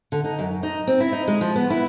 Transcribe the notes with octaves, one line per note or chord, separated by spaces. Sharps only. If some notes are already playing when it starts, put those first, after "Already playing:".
D3
D#4
F#2
D#4
C4
E4
D#4
G#3
F3
B3
E4